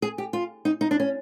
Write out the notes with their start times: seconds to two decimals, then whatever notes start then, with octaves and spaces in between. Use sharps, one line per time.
0.02 G#4
0.18 G4
0.33 F4
0.65 D#4
0.81 D#4
0.91 D4
1.00 C#4